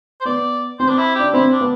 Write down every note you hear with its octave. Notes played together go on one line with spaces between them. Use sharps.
C5
B3 D5
C4 C5
D4
E4
D4 G4
C4 E4
D4
B3